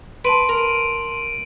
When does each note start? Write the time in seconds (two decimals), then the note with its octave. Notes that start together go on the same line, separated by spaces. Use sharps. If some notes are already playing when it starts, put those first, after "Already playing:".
0.25 B4 A5 C6 D7 D#7 F#7
0.49 A#4